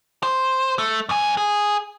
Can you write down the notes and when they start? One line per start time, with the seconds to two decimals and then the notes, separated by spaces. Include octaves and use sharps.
0.23 C5
0.79 A3
1.09 F2 G#5
1.37 G#4